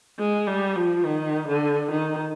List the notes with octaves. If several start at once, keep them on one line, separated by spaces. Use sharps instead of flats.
G#3
G3
F3
D#3
D3
D#3